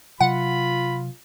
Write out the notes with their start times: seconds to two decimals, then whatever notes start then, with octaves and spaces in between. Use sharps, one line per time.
0.21 C3 F#3 F4 F#5 B5